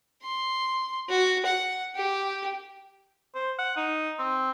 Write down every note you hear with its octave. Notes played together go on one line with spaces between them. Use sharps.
C6
F#4
F#5
G4
C5
F#5
D#4
C4